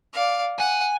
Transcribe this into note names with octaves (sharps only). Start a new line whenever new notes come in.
D5 F5
F#5 G#5